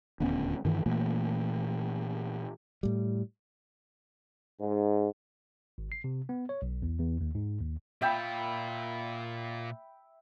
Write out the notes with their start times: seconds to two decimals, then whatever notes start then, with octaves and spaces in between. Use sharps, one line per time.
0.20 D#1 D2 B3 C#4
0.65 G2 D#3 E3
0.86 A#2 E3 A3 A#3
2.83 A2 G3
4.60 G#2
5.78 G#1
5.92 C7
6.04 C3
6.29 B3
6.49 C#5
6.62 B1
6.82 E2
6.99 E2
7.21 D#2
7.35 G#2
7.61 D#2
8.02 A#2 F4 E5 G5 B5